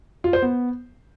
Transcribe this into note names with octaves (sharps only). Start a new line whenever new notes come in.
F4
C5
B3